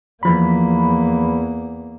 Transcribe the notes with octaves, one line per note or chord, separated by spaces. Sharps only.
E2 E3 F3 A#3 B5